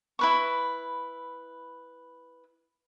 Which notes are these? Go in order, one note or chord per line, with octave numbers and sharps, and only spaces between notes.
E4 B4 C#6